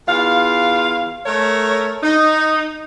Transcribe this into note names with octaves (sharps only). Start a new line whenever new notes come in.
E2 F4 F5
A3 A#4 C#5
D#4